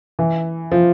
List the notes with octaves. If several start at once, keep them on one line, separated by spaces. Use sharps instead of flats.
E3
F3